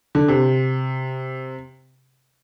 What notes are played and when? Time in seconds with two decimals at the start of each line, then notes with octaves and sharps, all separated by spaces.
0.15 D3
0.28 C3